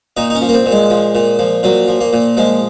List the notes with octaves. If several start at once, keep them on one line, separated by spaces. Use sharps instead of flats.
A#2 D#4
D#4
C#4
F3
A#3
C4
A#2
G#3
F3
A#2
F3
A#2 F#3
F3
A#3
A#2
F3 G#3